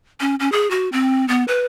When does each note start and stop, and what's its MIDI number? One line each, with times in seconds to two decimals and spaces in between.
0.20 0.35 61
0.40 0.51 61
0.52 0.69 68
0.71 0.89 66
0.92 1.25 60
1.28 1.44 59
1.48 1.65 71